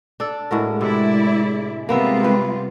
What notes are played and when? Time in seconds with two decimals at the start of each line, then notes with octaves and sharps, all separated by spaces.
0.20 D4 A4
0.51 A2 G#3 F#4 A#4
0.81 C3 E4 D5
1.89 C3 G3 A#3 B3 F4 E5
2.24 B4